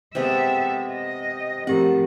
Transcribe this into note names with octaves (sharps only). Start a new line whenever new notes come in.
C3 G#3 B3 A4 E5
D#5
A2 F3 C4 G4 A#4 F#5